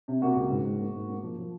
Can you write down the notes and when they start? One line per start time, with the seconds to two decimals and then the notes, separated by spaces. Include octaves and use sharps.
0.08 C3
0.22 A#3 F#4
0.36 C#2
0.51 G#2
0.65 G#2
0.80 A#3
0.95 G#2
1.09 A#3
1.23 F3
1.38 F3